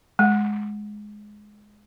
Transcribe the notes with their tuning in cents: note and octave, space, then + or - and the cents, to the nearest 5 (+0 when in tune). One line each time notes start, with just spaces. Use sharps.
G#3 +10